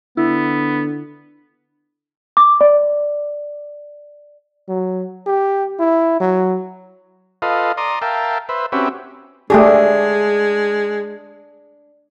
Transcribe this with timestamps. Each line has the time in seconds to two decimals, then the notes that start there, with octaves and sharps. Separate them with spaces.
0.17 D3 B3 E4
2.37 D6
2.61 D5
4.69 F#3
5.27 G4
5.79 E4
6.20 F#3
7.42 F4 A4 B4 D#5 F5
7.77 D5 A#5 C6 D#6
8.02 A#4 E5 F5 G5 A5
8.49 B4 C5 E5
8.72 C4 C#4 F#4 G4 B4 E5
9.50 G#3 A3 D4 G4 G#4